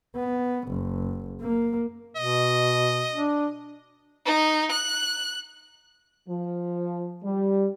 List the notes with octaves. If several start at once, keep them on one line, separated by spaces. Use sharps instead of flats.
B3
F#1
A#3
B2 D#5
D4
D#4
F#6
F3
G3